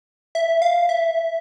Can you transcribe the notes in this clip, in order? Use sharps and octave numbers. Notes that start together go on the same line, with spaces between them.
E5
F5
E5